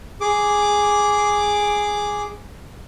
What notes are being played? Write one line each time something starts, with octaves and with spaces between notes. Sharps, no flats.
G#4 D6